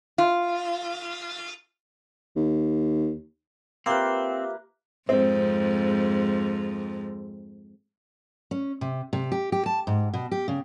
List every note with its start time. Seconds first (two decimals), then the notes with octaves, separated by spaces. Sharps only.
0.18 F4
2.36 D#2
3.86 A#3 C4 F4 G4 B4 E5 F5
5.09 F2 G#2 C4
8.51 C#4
8.81 C3
9.13 C3
9.32 G4
9.52 G4
9.66 A5
9.87 G#2
10.14 B2
10.31 G4
10.48 C#3